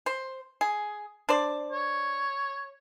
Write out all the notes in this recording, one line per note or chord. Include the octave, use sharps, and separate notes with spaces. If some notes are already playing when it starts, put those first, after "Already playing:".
C5
G#4
D4 C5 D5
C#5